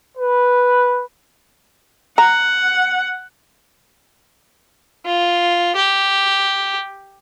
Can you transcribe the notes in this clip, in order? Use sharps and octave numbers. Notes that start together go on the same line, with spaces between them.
B4
F#5 A#5
F4
G4